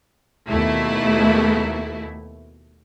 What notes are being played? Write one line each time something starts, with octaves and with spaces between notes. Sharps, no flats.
D#2 B2 A3 E4